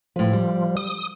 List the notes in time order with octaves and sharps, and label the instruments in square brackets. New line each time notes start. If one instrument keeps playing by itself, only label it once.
[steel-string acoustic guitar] A2 B4 [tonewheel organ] F3
[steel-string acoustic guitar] G3
[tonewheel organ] D#6